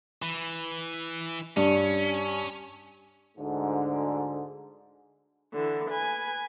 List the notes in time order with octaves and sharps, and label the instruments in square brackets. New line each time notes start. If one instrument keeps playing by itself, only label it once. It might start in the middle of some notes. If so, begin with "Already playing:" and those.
[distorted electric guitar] E3
[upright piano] G2 [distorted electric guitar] C#4
[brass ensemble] D2 G#2 D3
[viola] D3 E3
B4 G#5